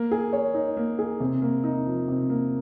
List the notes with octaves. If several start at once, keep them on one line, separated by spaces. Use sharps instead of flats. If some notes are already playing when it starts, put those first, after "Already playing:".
Already playing: A#3
G#4
C#5
D#4
A#3
G#4
C3
A#3
D#4
F3
C3
A#3